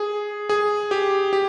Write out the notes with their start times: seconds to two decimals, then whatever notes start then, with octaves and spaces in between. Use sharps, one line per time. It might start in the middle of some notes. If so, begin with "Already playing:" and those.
Already playing: G#4
0.49 G#4
0.91 G4
1.33 G4